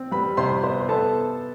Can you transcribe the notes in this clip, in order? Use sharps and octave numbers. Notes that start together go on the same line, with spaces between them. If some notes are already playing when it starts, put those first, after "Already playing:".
Already playing: C4
G3 B4 B5
C3 C5 C6
B3 C5 C6
B3 A4 A5